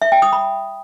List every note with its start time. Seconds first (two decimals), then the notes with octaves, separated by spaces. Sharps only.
0.02 E5
0.12 G5
0.22 D#6
0.33 B5